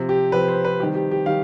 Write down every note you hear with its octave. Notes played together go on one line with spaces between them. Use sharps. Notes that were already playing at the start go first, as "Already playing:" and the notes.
Already playing: C3 F3 C4
G4
C3 F3 C4 B4
C5
B4
D#3 G3 C4 G4
G4
G4
D#3 G3 F5